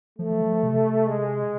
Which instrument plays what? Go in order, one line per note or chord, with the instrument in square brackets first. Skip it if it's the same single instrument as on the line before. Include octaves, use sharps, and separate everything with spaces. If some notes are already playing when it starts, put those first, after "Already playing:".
[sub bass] F3 [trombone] A3
[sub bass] F3
F3
F3
C3
[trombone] G#3